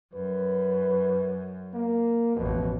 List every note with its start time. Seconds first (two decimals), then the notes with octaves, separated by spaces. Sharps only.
0.14 F#2 B4
1.74 A#3
2.36 A1 F2 B2